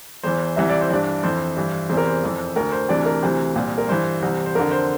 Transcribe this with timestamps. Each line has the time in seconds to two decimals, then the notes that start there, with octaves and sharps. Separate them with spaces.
0.23 E2 E3 C5
0.56 C2 C3 E3 E5
0.69 D5
0.81 C5
0.90 G2 E3 D4 D5
1.23 F2 E3 C5
1.56 G2 E3
1.89 E2 C3 E3 C5
1.97 A#4
2.07 C5
2.23 F2 E3
2.56 D2 D3 A#4
2.72 C5
2.89 D2 C3 E3 D4 D5
3.06 A#4
3.22 D2 C3 E3 C5
3.56 C2 A#2
3.78 A#4
3.88 G2 E3 C5
4.22 C2 C3 E3
4.46 C5
4.55 F2 D3 A#4
4.71 C5